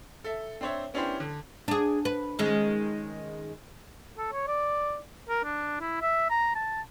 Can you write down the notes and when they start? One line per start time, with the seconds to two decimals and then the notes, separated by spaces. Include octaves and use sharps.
0.24 A4 E5
0.61 C4 D4 C5 C#5 E5
0.94 B3 C#4 D4 E4 G4 C5
1.20 D3
1.68 D4 G#4
2.05 B4
2.39 D#3 G#3 C#4
4.18 A4
4.33 C#5
4.48 D5
5.29 A#4
5.44 D4
5.80 E4
6.02 E5
6.30 A#5
6.55 A5